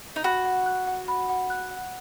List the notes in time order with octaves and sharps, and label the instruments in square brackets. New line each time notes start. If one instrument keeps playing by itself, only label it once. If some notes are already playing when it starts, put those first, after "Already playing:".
[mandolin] D#4
[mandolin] F#4 [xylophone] B5
[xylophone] F#5
F#6
F#5
B5
F#5
F#6
F#5